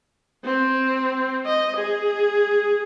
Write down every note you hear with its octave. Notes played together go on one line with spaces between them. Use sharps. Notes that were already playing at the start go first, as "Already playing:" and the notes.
C4
D#5
G#4